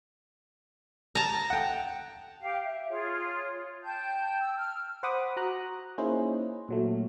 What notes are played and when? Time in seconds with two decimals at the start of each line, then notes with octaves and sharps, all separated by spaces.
1.15 A5 A#5
1.50 F#5 G5
2.40 G4 F5
2.64 E5
2.90 F4 G#4 C#5
3.83 G5 A5 G6
4.40 E6
4.58 F6
5.03 C5 F#5 B5 D6 D#6
5.37 F#4 A#5 F#6
5.98 A#3 C#4 D#4 E4 G#4 C5
6.68 A#2 F#3 A3